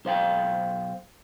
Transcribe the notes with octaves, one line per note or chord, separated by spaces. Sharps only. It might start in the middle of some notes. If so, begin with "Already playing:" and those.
B1 C5 F5 G5